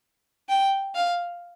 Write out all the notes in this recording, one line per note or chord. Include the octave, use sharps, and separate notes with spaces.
G5
F5